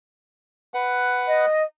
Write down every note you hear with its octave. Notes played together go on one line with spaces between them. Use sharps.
B4 F#5
D#5